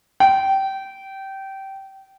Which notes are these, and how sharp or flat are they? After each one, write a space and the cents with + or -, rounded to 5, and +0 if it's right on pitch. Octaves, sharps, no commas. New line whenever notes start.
G5 -20